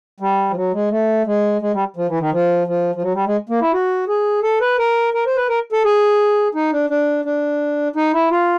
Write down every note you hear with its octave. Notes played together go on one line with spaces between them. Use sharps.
G3
F3
F#3
G#3
A3
G#3
G#3
G3
F3
E3
D#3
F3
F3
F3
F#3
G3
G#3
A#3
E4
F#4
G#4
A4
B4
A#4
A#4
C5
B4
A#4
A4
G#4
D#4
D4
D4
D4
D#4
E4
F4